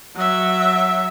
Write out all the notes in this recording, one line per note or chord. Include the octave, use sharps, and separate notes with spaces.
F#3 E5